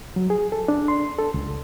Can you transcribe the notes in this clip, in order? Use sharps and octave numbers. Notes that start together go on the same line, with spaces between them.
F#3
G#4
A4
D4
C6
A4
C#2